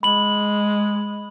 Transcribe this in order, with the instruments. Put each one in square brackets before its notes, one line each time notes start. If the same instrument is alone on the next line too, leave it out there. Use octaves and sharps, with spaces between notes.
[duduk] G#3 [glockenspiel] B5 F#7